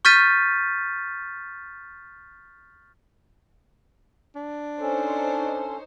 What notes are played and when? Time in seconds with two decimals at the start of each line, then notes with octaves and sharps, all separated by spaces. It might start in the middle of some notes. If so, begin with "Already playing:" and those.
0.05 C#6 F6 G6 A6 B6 D#7
4.35 D4
4.81 C#4 D#4 A4 C5 C#5